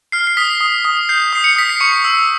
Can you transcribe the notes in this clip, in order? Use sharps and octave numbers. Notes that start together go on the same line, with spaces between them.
F6 C7
C7
D#6 B6
D#6
D#6
G6 C7
D#6 C7
C#7
D#6 B6
C7
C#6 C#7
E6